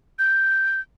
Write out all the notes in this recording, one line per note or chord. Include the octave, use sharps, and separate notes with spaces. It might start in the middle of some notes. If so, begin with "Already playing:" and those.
G6